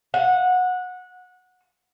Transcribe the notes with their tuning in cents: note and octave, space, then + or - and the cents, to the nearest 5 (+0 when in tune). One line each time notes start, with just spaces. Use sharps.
F#5 -20